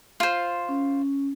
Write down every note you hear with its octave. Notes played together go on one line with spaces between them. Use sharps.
F4 C5
C#4